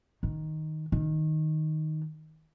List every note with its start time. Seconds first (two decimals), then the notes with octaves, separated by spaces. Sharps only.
0.23 D#3
0.92 D#3